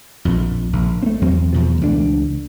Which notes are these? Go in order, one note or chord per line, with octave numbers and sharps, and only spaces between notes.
A#1 F2
A#1
A3 C4
E2 F#3 C4
E2 B2 F3
C#2 E3 A3 D4